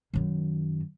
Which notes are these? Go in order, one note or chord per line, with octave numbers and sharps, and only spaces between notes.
F#2 D#3